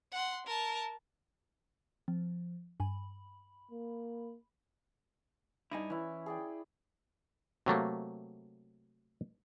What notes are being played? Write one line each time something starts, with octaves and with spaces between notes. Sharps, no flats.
F#5 C6
A#4 A5
F3 C4
G2 G#5 B5
A#3
G2 D#4 E4 D5 G#5
E3 C#4 E4
G#4 D5 G5
C3 F#3 A3 A#3